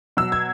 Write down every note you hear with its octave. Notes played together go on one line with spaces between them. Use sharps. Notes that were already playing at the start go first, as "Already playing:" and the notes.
B2 F#3 E6
G#6